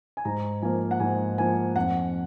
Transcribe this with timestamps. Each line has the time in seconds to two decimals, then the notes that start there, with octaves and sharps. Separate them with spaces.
0.17 G#5
0.25 G#2 A#5
0.62 F3 A#3 G#5
0.91 F#5
1.00 G#2 G#5
1.38 F3 A#3 G#5
1.76 F2 F#5